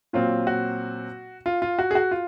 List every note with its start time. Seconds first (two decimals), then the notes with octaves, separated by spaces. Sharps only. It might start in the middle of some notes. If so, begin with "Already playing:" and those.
0.13 A#2 F#3 C4 F4
0.47 F#4
1.46 F4
1.62 F4
1.79 F#4
1.91 G#4
1.95 F#4
2.11 F4